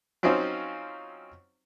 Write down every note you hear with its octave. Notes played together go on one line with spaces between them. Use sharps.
F#3 C4 C#4 D#4 F4